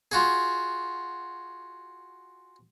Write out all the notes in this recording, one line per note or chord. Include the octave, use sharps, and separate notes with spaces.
F4 F#4 G#4